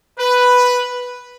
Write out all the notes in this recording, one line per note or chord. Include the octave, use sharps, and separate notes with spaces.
B4